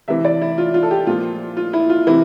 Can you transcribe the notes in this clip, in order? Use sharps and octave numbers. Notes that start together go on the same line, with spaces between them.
C3 E3 E5
D5
E4
F4
F4
A4
G4
A#2 F3 F4
F4
E4
F4
C3 E3 E4